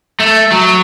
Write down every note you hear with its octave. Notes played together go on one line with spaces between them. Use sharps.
A3
F#3